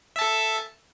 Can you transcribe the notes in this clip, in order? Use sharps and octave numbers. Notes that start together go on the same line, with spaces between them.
A4 E5 A5